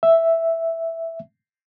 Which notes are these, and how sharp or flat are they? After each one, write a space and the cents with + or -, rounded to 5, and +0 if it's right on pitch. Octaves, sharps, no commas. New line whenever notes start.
E5 +0